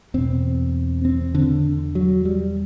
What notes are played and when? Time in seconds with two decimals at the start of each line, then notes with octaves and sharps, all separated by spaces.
0.14 E2 B2 C4
1.05 C4
1.35 D3
1.95 F#3
2.25 G3